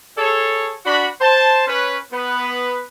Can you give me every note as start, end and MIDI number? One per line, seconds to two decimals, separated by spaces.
0.17 0.75 68
0.17 0.75 69
0.17 0.75 73
0.86 1.08 62
0.86 1.08 66
0.86 1.08 83
1.21 1.64 72
1.21 1.64 81
1.67 1.98 61
1.67 1.98 71
2.13 2.83 59
2.13 2.83 71